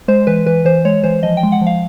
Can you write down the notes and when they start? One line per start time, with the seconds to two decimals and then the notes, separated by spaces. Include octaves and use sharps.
0.08 G#3 C5
0.27 E3 B4
0.46 E3 B4
0.65 E3 C5
0.85 G#3 C#5
1.03 E3 C5
1.23 F3 D#5
1.37 G5
1.43 G#3
1.52 F#5
1.61 F3
1.67 F5